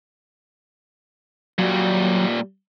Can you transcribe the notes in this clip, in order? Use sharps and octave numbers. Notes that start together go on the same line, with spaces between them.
A#2 F#3 G3